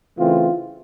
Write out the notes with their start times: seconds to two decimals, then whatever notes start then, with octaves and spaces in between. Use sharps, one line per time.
0.17 C#3 E3 A3 C4 F4